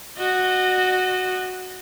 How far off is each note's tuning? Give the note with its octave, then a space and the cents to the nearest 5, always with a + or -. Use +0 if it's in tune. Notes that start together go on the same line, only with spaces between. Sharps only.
F#4 +0 D#5 -30